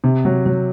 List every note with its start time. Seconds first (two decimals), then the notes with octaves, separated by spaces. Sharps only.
0.04 C3
0.25 F#3
0.46 F#3